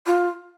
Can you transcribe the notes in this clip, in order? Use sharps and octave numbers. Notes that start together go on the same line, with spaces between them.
F4